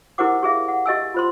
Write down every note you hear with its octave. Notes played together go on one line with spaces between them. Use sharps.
E4 G4 A#4 C5 F#5 D6
G4 G#4 E5 F5
F#5
G4 D#5 E5 G#5 E6
F4 C5 C6